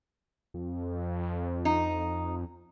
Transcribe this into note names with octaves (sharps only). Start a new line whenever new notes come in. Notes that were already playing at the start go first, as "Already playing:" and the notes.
F2
D#4